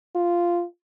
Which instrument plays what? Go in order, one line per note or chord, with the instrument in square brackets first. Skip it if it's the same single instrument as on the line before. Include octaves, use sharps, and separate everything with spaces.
[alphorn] F4